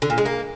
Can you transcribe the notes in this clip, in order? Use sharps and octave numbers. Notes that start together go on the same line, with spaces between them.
D3
A#2
G#3
A#3